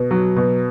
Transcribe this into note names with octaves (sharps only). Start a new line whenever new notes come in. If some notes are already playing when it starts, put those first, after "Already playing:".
Already playing: B2
F#3
B2